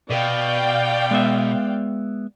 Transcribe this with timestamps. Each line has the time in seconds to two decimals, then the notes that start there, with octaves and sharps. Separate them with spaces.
0.10 B2 D5 F5 G5
1.11 G#3 B3 E5